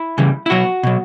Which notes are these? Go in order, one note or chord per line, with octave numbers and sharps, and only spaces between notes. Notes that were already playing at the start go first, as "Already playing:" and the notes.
Already playing: E4
C#3 E3 G3
E4
B2 F#3 F#4
B2 F#3